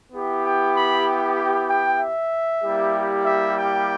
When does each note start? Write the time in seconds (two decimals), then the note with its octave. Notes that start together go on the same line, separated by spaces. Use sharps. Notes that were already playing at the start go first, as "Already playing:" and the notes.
0.12 B3 E4 G4
0.43 G5
0.75 B5
1.37 G5
1.69 G5
2.00 E5
2.62 G3 A#3 E4 G4
3.25 E5
3.56 G5